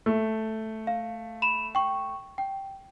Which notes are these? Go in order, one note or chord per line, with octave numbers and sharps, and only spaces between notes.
A3
F5
B5 E7 F7
G5 C#6
G5